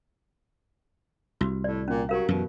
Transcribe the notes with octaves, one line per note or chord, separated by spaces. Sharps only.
C2 F#4
A2 D5
A#2 C#4
F#3 G4 A#4 F5
F#2 B2 E3